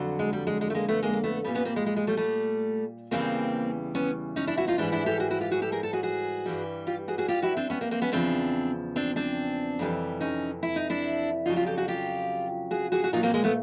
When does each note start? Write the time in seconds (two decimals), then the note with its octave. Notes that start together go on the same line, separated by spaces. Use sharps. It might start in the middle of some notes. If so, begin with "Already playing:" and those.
Already playing: F2 D3 F#3
0.19 G#3
0.33 G3
0.47 G#3
0.61 G#3
0.70 A3
0.75 G#3 A#3
0.89 A3 B3
1.03 G#3 A#3
1.13 A#3
1.24 A3 B3
1.44 A#2 G3 B3 C#4
1.55 B3 C#4
1.65 A#3 C4
1.76 G#3
1.86 G#3
1.96 G#3
2.07 G3 A3
2.17 G3 A3
3.11 E2 C#3 E3 G3 A#3 C4
3.95 B3 C#4
4.36 C#4 D#4
4.47 D4 E4
4.57 E4 F#4
4.68 D#4 F4
4.78 G#2 E3 G3 D4 E4
4.92 D4 E4
5.06 G4 A4
5.20 F#4 G#4
5.31 E4 F#4
5.40 F4 G4
5.51 F#4 G#4
5.62 G4 A4
5.72 G#4 A#4
5.83 A4
5.93 F#4 G#4
6.03 F#4 G#4
6.46 G2 E3 G3
6.87 F4 G4
7.08 F#4 G#4
7.18 F#4 G#4
7.28 F4 G4
7.42 E4 F#4
7.57 C4 D4
7.70 B3 C#4
7.81 A#3 C4
7.91 A#3 C4
8.02 B3 C#4
8.12 E2 C#3 F3 C4 D4
8.96 C4 D4
9.16 C4 D4
9.79 F2 C3 E3 G3
10.21 C#4 D#4
10.63 E4
10.76 D#4
10.90 D4 E4
11.46 F2 C#3 F#3 D#4 F4
11.56 F4 G4
11.67 G4 A4
11.78 F#4 G#4
11.88 F4 G4
12.71 F#4 G#4
12.92 F#4 G#4
13.04 F#4
13.13 A#2 F#3 D#4 F4
13.23 A#3 C4
13.34 G#3 A#3
13.44 A3 B3